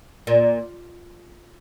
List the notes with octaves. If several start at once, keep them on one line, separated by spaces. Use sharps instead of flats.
A#2